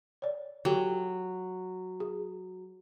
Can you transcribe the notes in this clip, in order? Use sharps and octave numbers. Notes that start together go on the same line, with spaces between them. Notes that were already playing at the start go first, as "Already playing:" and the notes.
C#5 D5
F#3 G4 A4 G5
G#4